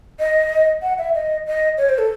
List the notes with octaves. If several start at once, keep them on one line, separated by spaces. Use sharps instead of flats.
D#5
F#5
E5
D#5
D#5
C#5
C5
A4